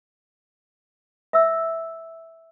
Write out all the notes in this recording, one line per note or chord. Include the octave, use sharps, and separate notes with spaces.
E5 E6